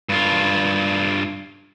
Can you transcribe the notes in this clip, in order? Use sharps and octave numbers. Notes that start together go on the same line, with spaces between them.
G2 F4